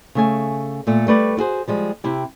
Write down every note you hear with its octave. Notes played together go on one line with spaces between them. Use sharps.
C#3 A3 G#5
A#2 A3 A4
G3 A3 B4 D5
E4 F#4 G#4 C5
F3 G3 G#3
C3 E4 G4